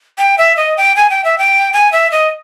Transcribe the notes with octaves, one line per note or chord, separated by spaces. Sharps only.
G5
E5
D#5
G5
G#5
G5
E5
G5
G#5
E5
D#5